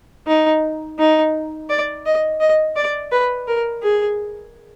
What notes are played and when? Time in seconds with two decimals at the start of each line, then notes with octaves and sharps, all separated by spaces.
0.27 D#4
0.99 D#4
1.70 D5
2.05 D#5
2.40 D#5
2.76 D5
3.12 B4
3.48 A#4
3.82 G#4